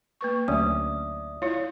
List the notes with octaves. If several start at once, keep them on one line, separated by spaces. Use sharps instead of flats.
A#3 B4 C#6
D2 F#3 C#4 D5 E5 D#6
E4 F4 C#5